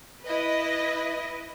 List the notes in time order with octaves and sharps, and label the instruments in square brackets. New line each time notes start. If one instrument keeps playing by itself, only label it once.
[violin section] E4 B4 D#5